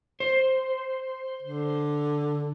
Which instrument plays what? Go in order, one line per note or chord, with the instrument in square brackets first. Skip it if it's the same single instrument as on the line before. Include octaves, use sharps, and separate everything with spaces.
[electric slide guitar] C5
[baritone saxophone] D3